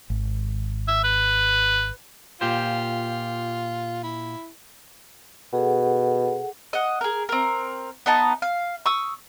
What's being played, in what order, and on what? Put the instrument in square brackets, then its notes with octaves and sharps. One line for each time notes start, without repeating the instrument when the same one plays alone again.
[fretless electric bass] G#1
[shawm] E5
B4
[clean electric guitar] A#2 G4 C5 [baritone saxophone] F4
[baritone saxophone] E4
[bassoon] B2 [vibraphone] G#4 A4 F#5
[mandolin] D#5 F#5
G#4 A#4
C4 A#4
B3 D#4 D#5 A5
F5
C#6 D#6 E6